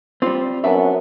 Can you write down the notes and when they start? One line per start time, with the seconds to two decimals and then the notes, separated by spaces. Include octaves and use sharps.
0.22 G3 C4 F4
0.64 F#2 B3 D4 E5